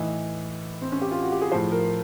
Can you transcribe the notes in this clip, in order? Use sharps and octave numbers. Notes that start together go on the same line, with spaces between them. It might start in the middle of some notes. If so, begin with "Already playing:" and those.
Already playing: A2 E3 D#4
C4
C#4
G4
F4
F#4
G4
G#4
A2 F3 C5
A#4